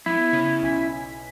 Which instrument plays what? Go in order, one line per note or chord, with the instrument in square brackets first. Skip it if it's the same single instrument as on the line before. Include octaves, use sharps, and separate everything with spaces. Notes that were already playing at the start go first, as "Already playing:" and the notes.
[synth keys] F3 B3 [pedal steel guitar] E4
[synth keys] C#3 C#4
B1 G#5 B6